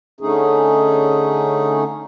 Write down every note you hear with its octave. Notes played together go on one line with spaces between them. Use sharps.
D3 A3 C#4 D#4 G#4